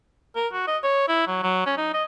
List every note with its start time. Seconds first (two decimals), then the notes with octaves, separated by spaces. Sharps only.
0.35 A#4
0.53 F#4
0.67 D#5
0.83 C#5
1.08 E4
1.27 F#3
1.43 F#3
1.66 C#4
1.77 D#4
1.94 D#5